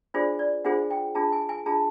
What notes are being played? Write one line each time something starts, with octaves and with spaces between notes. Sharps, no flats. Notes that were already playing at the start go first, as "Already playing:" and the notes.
D4 F4 G#4 C5 D5
D5
D4 F4 G#4 C5 F#5
G5
D4 F4 G#4 A5
G#5
G#5
D4 F4 G#4 A5